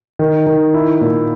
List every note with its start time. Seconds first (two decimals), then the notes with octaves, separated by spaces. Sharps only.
0.19 D#3
0.47 D#3
0.74 E4
1.01 A#2